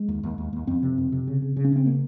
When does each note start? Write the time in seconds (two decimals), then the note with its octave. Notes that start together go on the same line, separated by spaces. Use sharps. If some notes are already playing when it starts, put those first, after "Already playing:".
Already playing: G#3
0.08 D#2
0.23 D#2
0.38 D#2
0.53 D#2
0.67 F2 C4
0.82 C3
0.98 F2
1.12 C3
1.27 C#3
1.42 C#3
1.56 C#3
1.65 C#4
1.72 C#3 C4
1.86 A#3